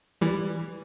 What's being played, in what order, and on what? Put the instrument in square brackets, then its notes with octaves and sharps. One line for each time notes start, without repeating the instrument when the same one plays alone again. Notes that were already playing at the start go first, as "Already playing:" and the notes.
[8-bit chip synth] E3 G3